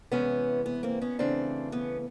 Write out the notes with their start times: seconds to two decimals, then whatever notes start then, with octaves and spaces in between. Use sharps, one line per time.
0.12 C3 E3 G#3 B3 C#4
0.66 B3
0.83 A#3 C4
1.01 B3 C#4
1.19 C#3 E3 A3 C4 D4
1.72 B3 C#4